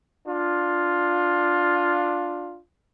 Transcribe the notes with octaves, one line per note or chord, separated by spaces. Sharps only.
D4 F4